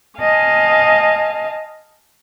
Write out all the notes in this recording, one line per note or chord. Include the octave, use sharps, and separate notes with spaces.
D#5 F5 G#5 A5